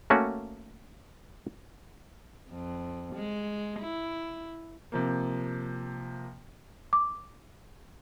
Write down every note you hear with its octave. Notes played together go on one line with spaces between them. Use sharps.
A3 A#3 C#4 F#4
F2
G#3
E4
C3 F3 A#3
D6